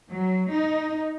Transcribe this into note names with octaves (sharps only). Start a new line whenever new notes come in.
F#3
D#4